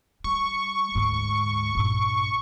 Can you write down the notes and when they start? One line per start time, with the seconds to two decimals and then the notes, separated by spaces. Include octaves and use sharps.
0.24 G3 C#6
0.95 D2 G#2
1.75 A#1 G2